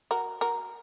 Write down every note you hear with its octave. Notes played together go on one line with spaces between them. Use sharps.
F#4 A#4
F#4 A#4